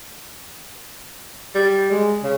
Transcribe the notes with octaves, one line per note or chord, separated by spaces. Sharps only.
G3
G#3
C#3